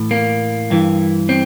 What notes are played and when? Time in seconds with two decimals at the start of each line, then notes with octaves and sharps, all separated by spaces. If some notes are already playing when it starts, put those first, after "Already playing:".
Already playing: A2 E3
0.11 A#3
0.70 G2 E3
1.29 C4